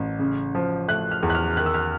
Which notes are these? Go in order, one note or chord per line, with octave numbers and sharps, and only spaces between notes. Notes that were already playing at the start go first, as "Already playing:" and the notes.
Already playing: A1
C#3
F3
A3 F#6
F6
E2
F#6
F6
D#3 F#6
E6
F6